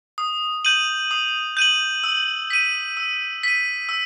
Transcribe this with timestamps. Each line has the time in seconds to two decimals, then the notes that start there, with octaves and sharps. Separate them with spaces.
0.18 D#6
0.65 G6 D#7 F#7
1.11 D#6
1.57 G6 D#7 F#7
2.04 E6
2.50 B6 D#7
2.97 E6
3.43 B6 D#7
3.89 E6